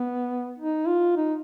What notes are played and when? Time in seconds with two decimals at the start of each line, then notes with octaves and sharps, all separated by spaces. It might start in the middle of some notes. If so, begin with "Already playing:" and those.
Already playing: B3
0.58 D#4
0.87 F4
1.17 D#4